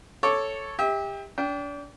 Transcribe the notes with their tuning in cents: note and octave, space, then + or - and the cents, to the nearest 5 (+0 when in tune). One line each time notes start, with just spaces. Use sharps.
A4 +0 C#5 +0 D6 +0
G4 +25 E5 -35
D4 -35 G5 +0